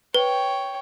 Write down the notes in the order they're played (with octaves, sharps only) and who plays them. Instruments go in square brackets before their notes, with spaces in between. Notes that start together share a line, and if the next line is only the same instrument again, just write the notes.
[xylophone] B4 [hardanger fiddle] C#5 G5